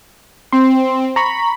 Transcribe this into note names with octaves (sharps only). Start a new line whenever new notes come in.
C4 C6
A#5 B5 C#6